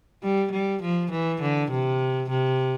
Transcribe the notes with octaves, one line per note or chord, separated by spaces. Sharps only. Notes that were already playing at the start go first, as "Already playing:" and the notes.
G3
G3
F3
E3
D3
C3
C3